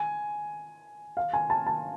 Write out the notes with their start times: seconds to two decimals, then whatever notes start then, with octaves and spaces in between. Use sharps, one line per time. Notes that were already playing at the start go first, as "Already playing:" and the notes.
Already playing: G#5
1.17 F5
1.33 G#5
1.50 A5
1.67 A5